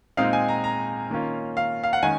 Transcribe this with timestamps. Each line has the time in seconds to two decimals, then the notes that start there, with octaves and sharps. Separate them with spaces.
0.17 A#2 G#3 C4 D#4 F5
0.33 G#5
0.49 A#5
0.64 A#5
1.10 D#3 A#3 C#4 F4
1.57 F5
1.84 F5
1.93 F#5
2.03 D#3 G#3 C#4 G#5